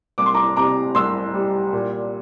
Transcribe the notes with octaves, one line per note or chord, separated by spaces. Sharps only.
C2 D6
C6
A#5 D6
C3 A#5 D6
C2 C6 E6
G3
A#2